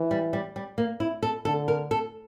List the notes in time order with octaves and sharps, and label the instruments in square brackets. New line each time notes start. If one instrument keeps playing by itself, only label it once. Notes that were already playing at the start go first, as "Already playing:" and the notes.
Already playing: [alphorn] E3
[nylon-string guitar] G3
G3
G3
A#3
E4
A4
[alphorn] D3 [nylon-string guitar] A4
[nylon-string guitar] A#4
A4